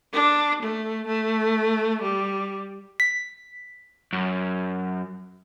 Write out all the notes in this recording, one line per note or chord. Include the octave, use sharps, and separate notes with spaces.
D4
A3
A3
G3
B6
F#2